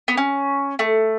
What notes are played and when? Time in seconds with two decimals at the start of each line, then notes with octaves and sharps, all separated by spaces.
0.08 B3
0.17 C#4
0.79 A3